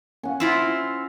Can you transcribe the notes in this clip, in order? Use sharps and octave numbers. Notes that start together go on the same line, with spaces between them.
C#4 F#5
C4 E4 F4